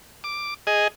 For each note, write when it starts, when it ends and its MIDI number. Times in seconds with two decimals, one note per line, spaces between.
0.24 0.54 86
0.67 0.88 68
0.67 0.88 75